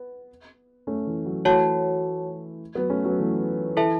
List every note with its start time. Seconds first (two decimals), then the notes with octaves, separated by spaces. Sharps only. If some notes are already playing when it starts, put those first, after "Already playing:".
Already playing: B3
0.87 A3 C#4
1.07 E3
1.25 F#3
1.45 E3 A3 F#4 C#5 F#5 A5
2.75 F#3 B3
2.90 A3 C#4
3.05 F#3 B3
3.19 E3 A3
3.77 E3 E4 A4 E5 A5